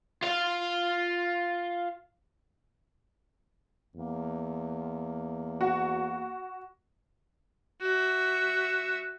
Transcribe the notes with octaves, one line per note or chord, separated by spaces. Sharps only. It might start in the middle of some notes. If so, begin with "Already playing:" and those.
F4 F5
E2 A#3
F#4
F#4 E5